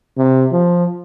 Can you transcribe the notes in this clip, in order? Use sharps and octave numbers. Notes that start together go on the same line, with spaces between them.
C3
F3